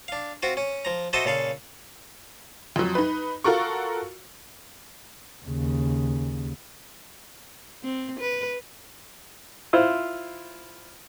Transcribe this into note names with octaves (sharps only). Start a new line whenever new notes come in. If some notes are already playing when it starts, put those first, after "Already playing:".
D4 F5
C4 F4 F#4
C#4
F3 A#5
F#4 A4 C5 D#5 E5 A5
A#2 C#3 A4 F5
F2 F#3
D#4 B4
F4 F#4 A4 A#4 C#6
D#2 C#3
C4
B4
E4 F4 C5